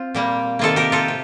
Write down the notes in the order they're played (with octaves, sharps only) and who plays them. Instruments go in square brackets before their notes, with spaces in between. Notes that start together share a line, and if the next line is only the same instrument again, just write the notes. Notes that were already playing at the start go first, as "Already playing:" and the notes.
Already playing: [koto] C4 F4
A#2 G3 A#3
C3 D#3 A#3 F4 A4
G4 A#4
F4 A4
C3